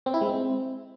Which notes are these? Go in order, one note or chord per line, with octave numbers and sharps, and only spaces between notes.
C4
E4
G#3
C4